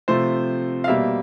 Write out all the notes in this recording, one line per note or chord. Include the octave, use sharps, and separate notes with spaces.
C3 F3 A3 C5
F5
B2 G3 A#3 E5